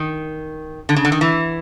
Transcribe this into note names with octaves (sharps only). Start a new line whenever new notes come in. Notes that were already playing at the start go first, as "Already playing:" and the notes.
Already playing: D#3
D3
C#3
D3
D#3
E3